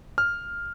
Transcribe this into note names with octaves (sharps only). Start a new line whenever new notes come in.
F6